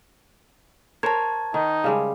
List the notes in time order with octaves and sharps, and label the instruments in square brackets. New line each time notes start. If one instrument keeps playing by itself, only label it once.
[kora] A#4 C5 C#5 [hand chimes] A5 G#6
[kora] D#3 [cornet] D#4
[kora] C#3 G3 G#3